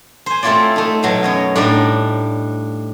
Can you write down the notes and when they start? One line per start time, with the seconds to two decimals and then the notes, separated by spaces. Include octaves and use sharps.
0.26 C5 G#5
0.43 A3 C4 E4 F4 C#5 D5
0.76 A3 D#4
1.03 B2 F#3 F5
1.23 F#2 C#5 D#5
1.56 A2 G3 D4 D#4 D5 A#5